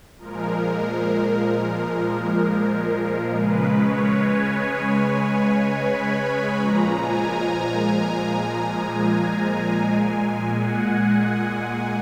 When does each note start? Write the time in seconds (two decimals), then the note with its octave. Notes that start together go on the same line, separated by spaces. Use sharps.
0.18 A#2 F3 G#3 A#4
3.38 C#3 G#3 B4
3.78 C#5
4.18 G#5
5.77 B5
6.57 A#2 F3 G#3 A#5
6.97 G#5
7.37 A#5
8.97 G#5
9.77 A#2 G#3
10.57 F#5